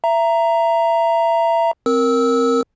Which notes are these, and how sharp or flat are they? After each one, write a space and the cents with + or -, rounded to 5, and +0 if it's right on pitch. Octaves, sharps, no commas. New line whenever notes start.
E5 +25 A#5 +0
C4 +5 A#4 +0 E6 -20